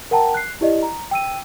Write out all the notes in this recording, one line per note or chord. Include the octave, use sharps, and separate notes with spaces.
A#4 F#5 G5 A5 A#5
F#6 C7
E4 G4 D5 D#5
A#5
G5 E6 D#7